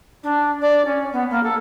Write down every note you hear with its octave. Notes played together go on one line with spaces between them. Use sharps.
D4
D5
C#4
B3
A#3
A4